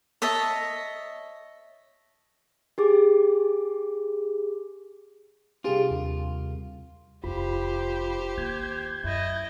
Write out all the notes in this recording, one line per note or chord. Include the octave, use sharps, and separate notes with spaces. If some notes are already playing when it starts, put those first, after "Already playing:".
C#5 D#5 E5 A5
G4 G#4 D6
C2 D4 F4 G4 G#4
D#2
F1 E4 F4 G4 C5 B5
D#2 A#3 G6 G#6
F#2 E4 D#5